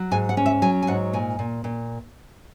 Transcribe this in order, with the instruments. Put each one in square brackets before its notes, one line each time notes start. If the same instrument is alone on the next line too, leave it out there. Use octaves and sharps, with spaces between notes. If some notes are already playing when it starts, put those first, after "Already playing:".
Already playing: [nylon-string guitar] F#3
G#2 G#5
F#5
C#4
E5
F#3 G#5
G#5
G#2 F#5
A#2 G#5
A#2
A#2